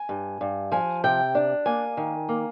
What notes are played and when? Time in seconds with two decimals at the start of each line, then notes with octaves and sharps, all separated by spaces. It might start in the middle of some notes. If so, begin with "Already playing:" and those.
Already playing: G#5
0.09 G2
0.41 G2
0.72 F3 G#5
1.04 C3 G5
1.35 D4
1.66 A#3 G#5
1.97 D#3
2.29 A#3